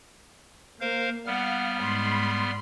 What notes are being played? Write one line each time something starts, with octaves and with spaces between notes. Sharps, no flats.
A#3 A#4 C5 F5
G3 B3 F5 F#5 F6
G#2 B5 C6